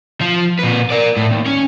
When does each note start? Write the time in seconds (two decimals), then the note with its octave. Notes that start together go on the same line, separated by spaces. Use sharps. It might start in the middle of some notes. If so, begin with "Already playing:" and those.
0.21 F3
0.59 A#2 B4
0.91 A#4 D5
1.17 A2
1.31 D#2
1.46 C#4